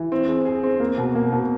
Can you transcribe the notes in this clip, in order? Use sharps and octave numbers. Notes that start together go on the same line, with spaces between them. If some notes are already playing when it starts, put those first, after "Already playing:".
Already playing: E3
C4
G#4
G#4
C4
A#3
B2
A#3
B2